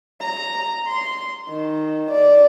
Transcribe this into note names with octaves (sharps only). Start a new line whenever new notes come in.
A#5
C6
D#3
D5